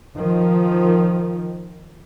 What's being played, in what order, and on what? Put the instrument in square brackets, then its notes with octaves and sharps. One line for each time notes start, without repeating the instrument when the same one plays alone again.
[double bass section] D#3 F3